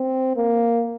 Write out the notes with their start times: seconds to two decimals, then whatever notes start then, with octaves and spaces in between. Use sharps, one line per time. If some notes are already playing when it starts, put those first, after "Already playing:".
Already playing: C4
0.36 A#3